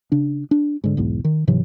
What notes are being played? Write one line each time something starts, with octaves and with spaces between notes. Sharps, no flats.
C#3 D4
D4
G#2 D3
B1 E2 G#2
D#3
G#2 C3 E3 F#3